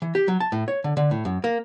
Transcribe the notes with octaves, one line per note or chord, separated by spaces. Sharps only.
E3
G4
F#3
A5
A2
C#5
D3
D3
A2
F#2
A#3